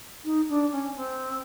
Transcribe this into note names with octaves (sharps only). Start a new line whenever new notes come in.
D#4
D4
C#4
C4